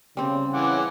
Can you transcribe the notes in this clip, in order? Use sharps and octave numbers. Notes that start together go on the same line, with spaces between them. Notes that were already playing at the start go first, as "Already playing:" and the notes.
C#3 G3 C4
E3 F#5 G#5 D6